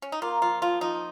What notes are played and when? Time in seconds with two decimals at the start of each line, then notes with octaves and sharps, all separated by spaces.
0.02 C#4
0.12 D#4
0.22 A#3 F4
0.42 F3 F4
0.62 F3 F4
0.81 F3 D#4